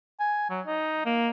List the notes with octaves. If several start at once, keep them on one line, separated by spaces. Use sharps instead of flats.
G#5
F#3
D#4
A#3